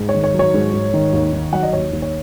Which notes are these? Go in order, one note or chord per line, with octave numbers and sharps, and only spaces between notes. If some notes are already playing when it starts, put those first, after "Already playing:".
Already playing: G#2
C#5
D#3
C#5
F#3
C#5
G#2
G#2
D#3
D#2
D#3
F#3 F#5
D#5
D#2 C#5
D#2
C#5